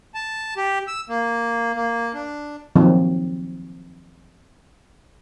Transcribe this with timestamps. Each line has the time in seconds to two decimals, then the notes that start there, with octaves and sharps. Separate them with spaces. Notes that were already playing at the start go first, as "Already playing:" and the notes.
0.15 A5
0.57 G4
0.88 E6
1.09 A#3
1.76 A#3
2.14 D4
2.76 D#3 F3 F#3 C4